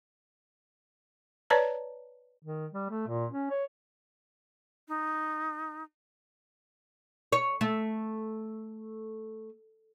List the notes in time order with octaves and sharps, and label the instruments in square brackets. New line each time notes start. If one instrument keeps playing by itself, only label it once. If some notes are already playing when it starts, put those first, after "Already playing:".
[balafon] B4 C#5 D5 A5 A#5
[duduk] D#3
G3
A3
A#2
C#4
C#5
[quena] D#4
[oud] C#5
A3